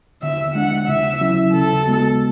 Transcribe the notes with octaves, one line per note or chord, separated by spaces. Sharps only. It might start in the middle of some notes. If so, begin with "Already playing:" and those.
D3 E5
G#3 D4 F#5
C#3 E5
F#3 C#4 E4
C#3 A4
G#3 B3 F#4